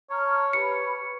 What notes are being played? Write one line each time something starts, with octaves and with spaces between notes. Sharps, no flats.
C#5 A5 A#5 F6
G4 B4 B5 C#7